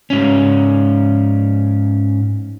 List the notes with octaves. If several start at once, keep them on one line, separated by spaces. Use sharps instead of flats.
G#2 C#4